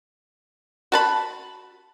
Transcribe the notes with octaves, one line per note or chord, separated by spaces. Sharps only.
F#4 A5 B5